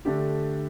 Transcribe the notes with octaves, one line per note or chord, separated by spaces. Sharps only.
D3 A3 D4 G4